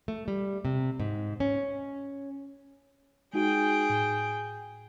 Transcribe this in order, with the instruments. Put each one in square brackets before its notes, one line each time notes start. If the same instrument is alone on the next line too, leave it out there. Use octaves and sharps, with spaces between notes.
[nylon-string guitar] A3
G3
C3
G#2
C#4
[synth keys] G#3 D#4 F#4 [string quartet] G#4 G5
[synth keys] A2